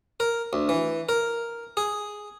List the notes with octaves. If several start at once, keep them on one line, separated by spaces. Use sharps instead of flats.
A#4
D2
E3
A#4
G#4